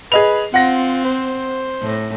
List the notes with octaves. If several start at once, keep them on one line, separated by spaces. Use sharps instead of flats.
G#4 B4 D#5 F7
C4 F4 F#5 A#6
C5
A2